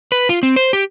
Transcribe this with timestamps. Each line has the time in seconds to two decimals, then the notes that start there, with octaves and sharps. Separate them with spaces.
0.12 B4
0.29 F4
0.43 C4
0.56 C5
0.73 G4